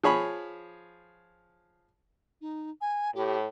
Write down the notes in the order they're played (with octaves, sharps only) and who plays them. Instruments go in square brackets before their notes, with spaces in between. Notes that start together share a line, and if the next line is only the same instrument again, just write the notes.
[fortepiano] F3 G#4 C#5 B5
[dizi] D#4
G#5
[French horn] A2 [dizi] G4